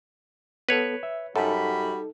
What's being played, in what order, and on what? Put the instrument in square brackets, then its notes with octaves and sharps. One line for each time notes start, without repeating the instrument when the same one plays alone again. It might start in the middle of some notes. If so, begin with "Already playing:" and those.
[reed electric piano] B3 A4 [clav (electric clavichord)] B4 C#5
[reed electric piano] E5
[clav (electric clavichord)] F#2 [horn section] G3 F#4 B5 [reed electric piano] D#4 A4